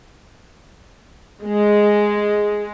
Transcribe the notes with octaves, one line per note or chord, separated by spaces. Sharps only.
G#3